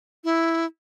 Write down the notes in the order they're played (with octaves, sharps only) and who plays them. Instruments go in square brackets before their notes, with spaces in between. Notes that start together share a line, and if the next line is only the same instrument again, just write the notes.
[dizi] E4